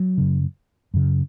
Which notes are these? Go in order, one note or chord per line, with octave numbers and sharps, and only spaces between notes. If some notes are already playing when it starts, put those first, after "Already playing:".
Already playing: F#3
F#2 C#3
F#2 C#3